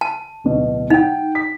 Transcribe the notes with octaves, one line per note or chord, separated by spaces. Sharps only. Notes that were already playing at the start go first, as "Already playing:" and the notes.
A5
D1 B2
D#4 F#5 G5
B6